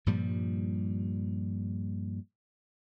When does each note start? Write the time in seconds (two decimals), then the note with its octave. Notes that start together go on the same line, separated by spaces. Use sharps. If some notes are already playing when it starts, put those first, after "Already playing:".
0.06 G2 A#2 F3 G3